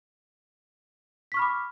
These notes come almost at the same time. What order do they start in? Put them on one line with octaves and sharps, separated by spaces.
B6 C#6 F6 B5 D6